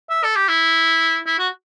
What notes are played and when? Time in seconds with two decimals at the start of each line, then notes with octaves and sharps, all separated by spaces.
0.10 E5
0.24 A4
0.36 G4
0.49 E4
1.26 E4
1.39 F#4